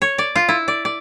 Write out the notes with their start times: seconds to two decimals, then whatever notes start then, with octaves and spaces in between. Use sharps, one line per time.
0.02 C#5
0.18 D5
0.36 F4
0.49 E4
0.68 D5
0.85 D5